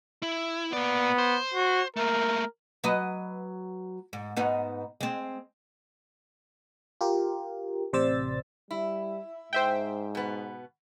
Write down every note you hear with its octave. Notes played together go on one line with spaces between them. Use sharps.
E4
A#3 B3 D5
C5
F#4
A3 A#3 A#4
F#3 B4 D#5
G#2
G#2 B3 D#4
G#3 C4
F4 G4 A#4
A1 C3 C5 D5 E6 A6
G3 E4
G#2 C5 E5 G5
B2 B3